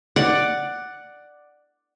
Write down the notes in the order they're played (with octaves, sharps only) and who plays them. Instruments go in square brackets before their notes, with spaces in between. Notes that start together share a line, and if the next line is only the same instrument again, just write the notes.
[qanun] D5 F#5